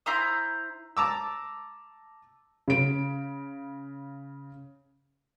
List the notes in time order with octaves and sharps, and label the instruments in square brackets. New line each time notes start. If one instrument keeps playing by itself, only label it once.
[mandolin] E4 C5 A#5 D#6
[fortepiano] A5 A#5 D6 E6
[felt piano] C#3 D7